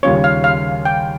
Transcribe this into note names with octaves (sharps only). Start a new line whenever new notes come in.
D#2 C#3 G3 C#4 F4 C#5
F5
F5
G5